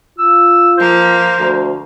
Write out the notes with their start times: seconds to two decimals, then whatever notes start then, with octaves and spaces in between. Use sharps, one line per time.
0.19 F4 E6
0.78 F3 A#3 C5
1.39 D2